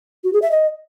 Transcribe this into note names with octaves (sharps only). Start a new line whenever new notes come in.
F#4
G#4
E5
D#5